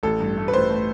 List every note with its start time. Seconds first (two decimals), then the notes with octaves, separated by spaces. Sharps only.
0.03 A1 A4
0.20 G2
0.37 A3
0.48 B4
0.53 A1 C5
0.70 A3